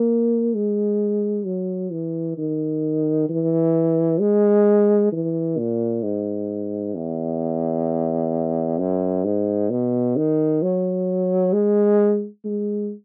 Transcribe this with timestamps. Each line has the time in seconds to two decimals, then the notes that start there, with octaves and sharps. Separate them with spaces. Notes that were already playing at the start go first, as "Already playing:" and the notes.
Already playing: A#3
0.55 G#3
1.46 F#3
1.92 E3
2.38 D#3
3.29 E3
4.20 G#3
5.12 E3
5.58 A#2
6.03 G#2
6.96 E2
8.79 F#2
9.25 G#2
9.70 B2
10.16 D#3
10.62 F#3
11.53 G#3
12.45 G#3